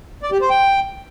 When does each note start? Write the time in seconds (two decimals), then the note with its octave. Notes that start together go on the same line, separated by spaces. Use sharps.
0.23 D5
0.32 G4
0.41 C5
0.50 G5